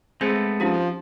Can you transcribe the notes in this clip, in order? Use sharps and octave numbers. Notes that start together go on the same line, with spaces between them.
G#3 A3 B3 C4 G#4 C5
F3 C#4 D#4 G4